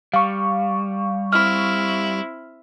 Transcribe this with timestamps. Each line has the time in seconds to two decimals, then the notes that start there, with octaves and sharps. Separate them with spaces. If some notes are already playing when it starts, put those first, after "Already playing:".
0.13 G3 F5 C#6
1.33 C4 E4 F6